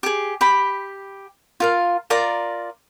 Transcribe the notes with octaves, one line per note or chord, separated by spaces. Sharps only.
G4 G#4
G4 G5 B5
F4 A#4 F5
F4 A#4 D5 A#5